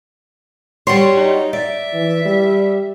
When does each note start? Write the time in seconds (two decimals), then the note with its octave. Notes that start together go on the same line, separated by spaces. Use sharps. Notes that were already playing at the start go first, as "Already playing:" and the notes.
0.87 G3 F#4 C#5 C6
1.17 D#4
1.53 D5 E5
1.93 E3
2.25 G3